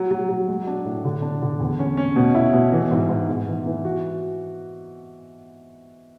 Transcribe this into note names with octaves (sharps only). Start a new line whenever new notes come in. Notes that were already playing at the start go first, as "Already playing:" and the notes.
Already playing: F#3
F#3
F#3
G#3
D4
A2
D3
D4
D3
E2
C#4
C#4
B2
E4
B2
E3
G#2
G#2
G#2
E3
E3
F#4